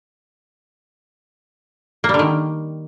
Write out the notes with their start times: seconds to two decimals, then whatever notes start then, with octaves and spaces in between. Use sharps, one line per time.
2.04 A#3
2.09 G3
2.14 D3
2.19 D#3